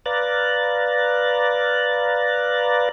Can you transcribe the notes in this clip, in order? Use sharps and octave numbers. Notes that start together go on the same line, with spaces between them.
B4 D5 F5 A#5 F#6 A6